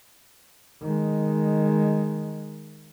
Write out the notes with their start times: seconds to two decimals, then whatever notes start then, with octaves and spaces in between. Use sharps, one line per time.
0.82 D#3 G#3